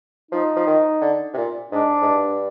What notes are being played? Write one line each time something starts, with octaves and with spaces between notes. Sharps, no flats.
F3 D#4
F3
D#3
D3
C3
A#2
G#2 D4
G#2
G2